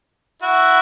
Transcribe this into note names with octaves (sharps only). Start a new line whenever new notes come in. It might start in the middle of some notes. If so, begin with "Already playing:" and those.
E4 F#4